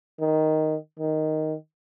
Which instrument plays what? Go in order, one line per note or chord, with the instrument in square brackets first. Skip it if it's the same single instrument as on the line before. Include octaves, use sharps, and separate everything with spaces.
[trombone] D#3
D#3